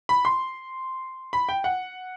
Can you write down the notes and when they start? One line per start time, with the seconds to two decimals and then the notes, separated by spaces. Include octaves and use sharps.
0.09 B5
0.25 C6
1.33 B5
1.49 G5
1.64 F#5